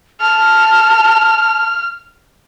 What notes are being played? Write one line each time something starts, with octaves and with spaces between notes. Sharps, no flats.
A5 F6